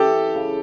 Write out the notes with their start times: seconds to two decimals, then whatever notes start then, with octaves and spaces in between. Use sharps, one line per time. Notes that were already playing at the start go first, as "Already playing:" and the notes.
Already playing: E3 G4 A4
0.35 C#3